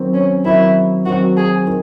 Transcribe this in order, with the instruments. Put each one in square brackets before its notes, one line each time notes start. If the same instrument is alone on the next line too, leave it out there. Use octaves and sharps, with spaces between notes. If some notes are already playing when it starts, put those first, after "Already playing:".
Already playing: [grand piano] D#3 F#3 C4
[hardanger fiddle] C#4
[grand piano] D#3 F#3 C4 [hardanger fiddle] E4
[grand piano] D#3 F#3 C4 [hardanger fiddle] F#4
[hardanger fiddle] G#4
[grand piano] D#3